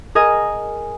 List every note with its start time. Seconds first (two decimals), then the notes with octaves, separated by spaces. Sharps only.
0.15 G#4 A#4 D#5 G#5